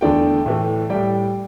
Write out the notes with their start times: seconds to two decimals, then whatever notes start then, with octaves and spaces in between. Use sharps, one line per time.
0.01 E2 D3 A3 D5 G5
0.46 A2 E3 A3
0.89 A2 G3 D5 G5